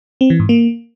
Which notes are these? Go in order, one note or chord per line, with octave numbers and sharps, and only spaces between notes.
C4
E3
G#2
A#3